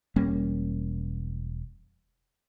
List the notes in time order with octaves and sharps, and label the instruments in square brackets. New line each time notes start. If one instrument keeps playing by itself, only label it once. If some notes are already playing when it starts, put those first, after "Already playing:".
[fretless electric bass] E1 G3 A#3 C#4